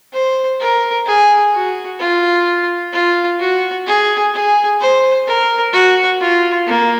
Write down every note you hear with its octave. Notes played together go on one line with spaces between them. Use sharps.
C5
A#4
G#4
F#4
F4
F4
F#4
G#4
G#4
C5
A#4
F#4
F4
A#3